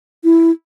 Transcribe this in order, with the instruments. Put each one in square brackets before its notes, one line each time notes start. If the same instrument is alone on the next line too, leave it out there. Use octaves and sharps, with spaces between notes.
[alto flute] E4